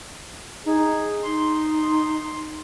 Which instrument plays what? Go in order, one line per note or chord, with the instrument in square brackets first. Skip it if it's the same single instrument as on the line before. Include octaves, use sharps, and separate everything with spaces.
[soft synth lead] D#4 [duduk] G#4
[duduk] D#4 [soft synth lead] C6